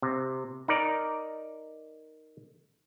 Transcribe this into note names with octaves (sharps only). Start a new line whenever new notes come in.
C3
D#4 A#4 D5